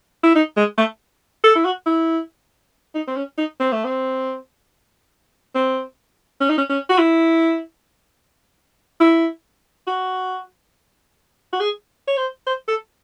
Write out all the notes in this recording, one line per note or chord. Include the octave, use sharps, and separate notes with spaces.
E4
D#4
G#3
A3
A4
E4
F#4
E4
D#4
C4
C#4
D#4
C4
A3
C4
C4
C#4
D#4
C#4
C#4
F#4
E4
E4
F#4
F#4
G#4
C#5
C5
C5
A4